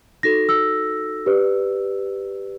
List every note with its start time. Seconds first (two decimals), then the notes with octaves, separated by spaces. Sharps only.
0.23 D#4 F#4 A4 A#6
0.49 E6
1.26 G4 B4 D5